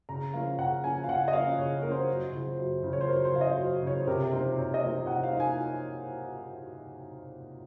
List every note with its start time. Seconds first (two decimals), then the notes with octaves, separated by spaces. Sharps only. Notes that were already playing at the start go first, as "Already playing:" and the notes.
0.09 C#3 A#5
0.34 F3 A#3 C#4 F5
0.59 C#3 F#5
0.84 F3 A#3 C#4 G#5
1.04 F5
1.08 C#3 F#5
1.28 D#5
1.33 F3 A#3 C#4 F5
1.58 C#3 C#5
1.82 F3 A#3 C#4 A#4
1.91 C5
2.08 F#2
2.33 C#3 F3
2.58 F#2
2.83 C#3 F3
2.93 C#5
3.01 C5
3.08 F#2 A#4
3.25 C5
3.32 C#3 F3 F5
3.41 D#5
3.57 F#2 C5
3.82 C#3 F3 C#5
3.98 C5
4.07 C3 A#4
4.32 F3 A#3 D#4 C5
4.58 C3 C#5
4.74 D#5
4.83 F3 A#3 D#4
5.07 C3 F#5
5.23 F5
5.32 F3 A#3 D#4
5.40 G#5